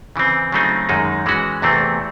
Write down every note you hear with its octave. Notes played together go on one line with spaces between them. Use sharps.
C#3 E3 C4
C#3 F#3 A3 C4 D#4
F#2 D#3 G#3 D#4
E3 G#3 C#4 F#4
E2 C3 E3 A3 C4